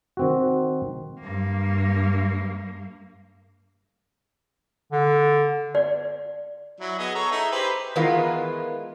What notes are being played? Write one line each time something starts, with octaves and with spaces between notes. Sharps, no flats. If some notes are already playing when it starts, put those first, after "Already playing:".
D#3 C4 F#4
G2 A#3
D3
D5
F#3 E4
B3 G#4 D#5
A4 C#5 A#5
D#4 E4 G#4
G4 B4 C5
D#3 E3 G#3 B3 F4 A#4